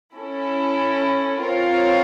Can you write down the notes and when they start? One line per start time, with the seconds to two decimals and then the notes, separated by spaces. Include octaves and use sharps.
0.13 C#4 E4 A4
1.43 C4 F4 A#4 C#5 F5